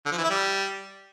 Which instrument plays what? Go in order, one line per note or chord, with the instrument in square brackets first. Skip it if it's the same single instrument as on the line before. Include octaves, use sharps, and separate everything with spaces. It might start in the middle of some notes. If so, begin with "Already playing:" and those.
[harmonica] D3
F3
E3
E4
G3